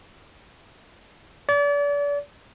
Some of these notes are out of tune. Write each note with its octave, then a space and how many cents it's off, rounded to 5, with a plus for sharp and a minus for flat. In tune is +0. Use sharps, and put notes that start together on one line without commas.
D5 -35